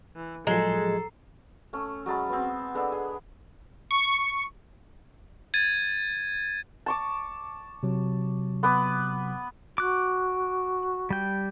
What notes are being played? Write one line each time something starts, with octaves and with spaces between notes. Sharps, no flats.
E3
A2 F3 F#3 G#3 A4 A#5 C7
A3 C#4
F#3 G#3 A5 B5
B3 C4
G#3 B3 D4 A4
G#4
C#6
G#6 A6 D#7
A5 C#6 D6
C3 F#3
B3 B4 D6
F#4 D6 F#6
G3 G5